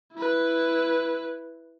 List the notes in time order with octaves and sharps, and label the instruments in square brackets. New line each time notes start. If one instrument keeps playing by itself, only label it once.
[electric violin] E4 B4